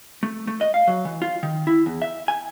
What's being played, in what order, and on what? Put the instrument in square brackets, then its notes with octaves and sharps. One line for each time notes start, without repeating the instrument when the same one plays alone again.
[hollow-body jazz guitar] A3
A3
D#5
F5
F#3
E3
F4
D#3
E4
E2
E5
G#5